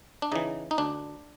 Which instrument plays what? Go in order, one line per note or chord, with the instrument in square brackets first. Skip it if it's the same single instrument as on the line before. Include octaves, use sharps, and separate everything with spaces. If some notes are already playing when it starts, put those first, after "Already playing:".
[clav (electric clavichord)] D4
C#3 E3 D#4
D#4
D2 D4